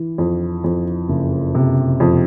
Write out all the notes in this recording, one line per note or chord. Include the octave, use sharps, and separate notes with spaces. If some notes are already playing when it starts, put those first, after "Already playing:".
Already playing: E3
F2
F2
F#1
C3
F2